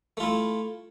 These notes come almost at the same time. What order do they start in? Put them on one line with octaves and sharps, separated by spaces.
A3 F4 E4